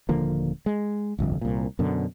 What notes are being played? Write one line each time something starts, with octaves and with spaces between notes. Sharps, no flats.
D#1 D3 F3 A#3
G#3
D1 G1 C2 F2
C2 A#2
F#2 B2 D3